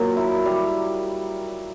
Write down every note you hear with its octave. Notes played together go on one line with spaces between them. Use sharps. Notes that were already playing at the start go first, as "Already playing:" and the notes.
Already playing: A#2 F#3
E4
G3